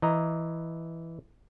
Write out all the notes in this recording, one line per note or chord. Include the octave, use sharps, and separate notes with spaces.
E3 D#5 A#5